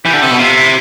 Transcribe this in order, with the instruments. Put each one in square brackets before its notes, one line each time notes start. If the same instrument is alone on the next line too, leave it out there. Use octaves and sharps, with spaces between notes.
[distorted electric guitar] E3 [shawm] G4
[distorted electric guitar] D3
[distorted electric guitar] C3 [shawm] A4
[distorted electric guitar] B2
[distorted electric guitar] C3 [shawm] F4
[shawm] E4